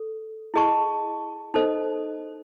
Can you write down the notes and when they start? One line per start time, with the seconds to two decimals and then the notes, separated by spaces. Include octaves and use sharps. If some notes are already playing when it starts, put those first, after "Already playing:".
Already playing: A4
0.54 E4 G#4 D#5 A5 C#6
1.54 D#4 A4 C5 D#5